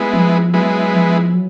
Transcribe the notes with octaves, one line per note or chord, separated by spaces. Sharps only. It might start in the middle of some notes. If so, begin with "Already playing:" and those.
Already playing: G#3 B3 E4
F3
F#3 G#3 B3 E4
F3
F#3